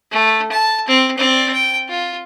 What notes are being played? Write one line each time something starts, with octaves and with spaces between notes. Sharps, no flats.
A3
A5
C4
C4 D5
G5
F4